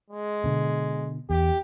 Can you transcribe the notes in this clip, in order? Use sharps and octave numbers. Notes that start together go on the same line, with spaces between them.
G#3
B2 D3
E2 G4